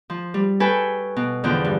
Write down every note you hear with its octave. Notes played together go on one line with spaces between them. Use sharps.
F3
G3
A4 B4 C#5 G5 G#5
B2
E2 D3 F3 B3 G5
G2